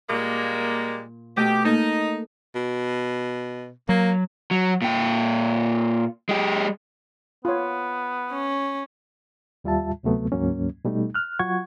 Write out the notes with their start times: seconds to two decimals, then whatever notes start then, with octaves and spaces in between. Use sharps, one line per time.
0.09 A#2 G3 G#3 A#3
1.36 B2 A3 G4 D#5
1.64 A#3 D#4 A4 A#4
2.55 B2
3.89 F#3 A#3
4.51 F#3
4.82 A#2 G5
6.29 G#3 G4
7.45 B3 F4 C#5
8.32 C#4
9.64 D#2 G3 F4 E5 A5
10.03 D2 C3 F#3 A3 B3
10.32 D2 G#2 F#3 A#3 C#4
10.85 B2 G3 A3 D#4
11.14 F6 F#6
11.39 F#3 F4 F#5 C#6 G#6